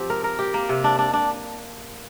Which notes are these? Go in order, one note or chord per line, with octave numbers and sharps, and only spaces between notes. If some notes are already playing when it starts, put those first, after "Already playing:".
Already playing: F3 C4 G4
A#4
A#4
G4
A#3
C3
D4
D4
D4